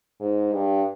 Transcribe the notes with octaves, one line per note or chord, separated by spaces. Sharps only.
G#2
G2